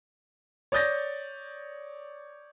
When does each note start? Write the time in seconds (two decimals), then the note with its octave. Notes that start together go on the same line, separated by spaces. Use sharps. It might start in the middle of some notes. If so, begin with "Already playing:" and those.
0.72 C#5 D5 D#6 G6 A6 A#6